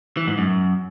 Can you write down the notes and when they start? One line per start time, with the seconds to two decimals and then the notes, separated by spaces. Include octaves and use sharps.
0.17 E3
0.27 G#2
0.38 F#2